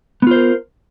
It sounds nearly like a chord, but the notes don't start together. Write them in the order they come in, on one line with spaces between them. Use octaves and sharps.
B3 F4 C5 A#4